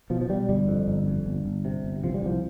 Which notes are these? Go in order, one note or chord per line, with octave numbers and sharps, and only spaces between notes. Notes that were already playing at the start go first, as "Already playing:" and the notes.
B2 F3
F3
B2 G3
G1 G3
F2
G1
F2
G1
G1
C3
G1
C3 F3
G3
C2 F3